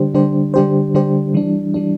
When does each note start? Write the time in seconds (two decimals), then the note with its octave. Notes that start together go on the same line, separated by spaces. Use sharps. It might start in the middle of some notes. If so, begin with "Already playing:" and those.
Already playing: D3 G3 D4 G4 C5
0.14 D3 G3 D4 G4 C5
0.54 D3 G3 D4 G4 C5
0.95 D3 G3 D4 G4 C5
1.34 E3 G3 D4
1.74 E3 G3 D4